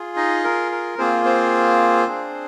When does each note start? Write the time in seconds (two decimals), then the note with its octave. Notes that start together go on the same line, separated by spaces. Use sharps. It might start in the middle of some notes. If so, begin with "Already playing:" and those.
Already playing: F4 G#4
0.16 D#4 D#5
0.44 A#4
0.72 A#4
0.98 A#3 C4 F4 G#4 C5
1.25 C4 C5
2.07 D4 G#4